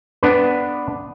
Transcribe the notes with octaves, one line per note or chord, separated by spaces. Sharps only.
B3 D4 B4